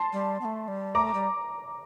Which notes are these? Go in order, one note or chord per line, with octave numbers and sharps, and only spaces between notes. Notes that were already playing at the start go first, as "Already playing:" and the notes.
Already playing: A5 C6
G3
B3
A3
G3
A3 A#5 D6
G3